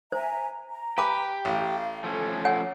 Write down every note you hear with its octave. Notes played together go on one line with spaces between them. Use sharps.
C5 E5 G#5 A#5
A#5
G4 B4 G#5 D6
A1 F5
F3 A3 C#4 A4
C#5 F#5 G#5